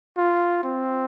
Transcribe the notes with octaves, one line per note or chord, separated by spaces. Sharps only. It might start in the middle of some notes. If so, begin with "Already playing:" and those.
F4
C4